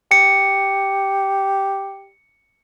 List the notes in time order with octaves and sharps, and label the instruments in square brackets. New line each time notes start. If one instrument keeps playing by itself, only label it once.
[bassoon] G4 [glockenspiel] C#7